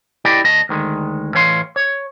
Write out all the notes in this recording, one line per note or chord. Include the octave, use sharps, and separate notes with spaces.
E4 G4 D5 D#5 G5
D2 D#5 A5
D2 D#3 G#3
A2 E3 C#5 F5 C6
C#5